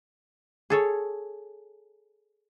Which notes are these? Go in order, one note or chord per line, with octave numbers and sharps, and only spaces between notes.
G#4 A4 C#5